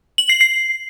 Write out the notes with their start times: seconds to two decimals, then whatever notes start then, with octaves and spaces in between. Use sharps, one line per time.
0.18 F#7
0.29 C7
0.41 C7